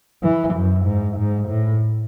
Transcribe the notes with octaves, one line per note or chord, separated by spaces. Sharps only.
E3
F#2
G#2
G#2
A2